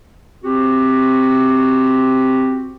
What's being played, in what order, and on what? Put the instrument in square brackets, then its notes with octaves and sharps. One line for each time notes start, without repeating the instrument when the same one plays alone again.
[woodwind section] C4 F#4 G4